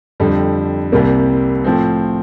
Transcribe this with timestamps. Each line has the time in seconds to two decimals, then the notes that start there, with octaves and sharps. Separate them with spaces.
0.20 F2 D3 G3
0.92 C2 C3 G3 A#3
1.64 A2 F3 C4